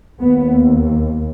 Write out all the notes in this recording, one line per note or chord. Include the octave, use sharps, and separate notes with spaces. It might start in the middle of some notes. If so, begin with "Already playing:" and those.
D#2 B3